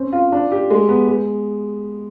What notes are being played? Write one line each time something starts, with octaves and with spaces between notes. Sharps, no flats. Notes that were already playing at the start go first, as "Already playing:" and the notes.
Already playing: C4 C#4
F4
D4
G4
G#3
B3
G#3